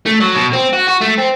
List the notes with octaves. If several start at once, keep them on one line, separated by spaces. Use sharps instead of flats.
A3
F#3
B2
C4
F#4
F#4
A3
C4